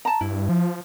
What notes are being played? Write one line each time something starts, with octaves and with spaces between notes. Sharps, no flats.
A5 A#5
G2 E4
F3